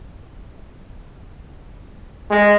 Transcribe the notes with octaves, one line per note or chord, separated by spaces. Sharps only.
G#3